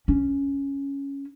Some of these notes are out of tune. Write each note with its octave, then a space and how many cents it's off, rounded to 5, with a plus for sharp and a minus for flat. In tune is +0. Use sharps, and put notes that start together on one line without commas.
C#4 +5